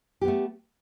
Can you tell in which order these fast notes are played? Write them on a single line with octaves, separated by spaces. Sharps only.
G4 B3 A3